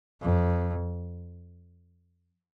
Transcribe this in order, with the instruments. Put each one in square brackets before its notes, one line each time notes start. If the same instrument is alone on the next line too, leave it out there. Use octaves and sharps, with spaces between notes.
[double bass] F2